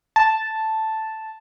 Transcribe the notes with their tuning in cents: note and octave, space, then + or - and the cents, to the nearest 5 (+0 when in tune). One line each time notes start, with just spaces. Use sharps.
A5 +0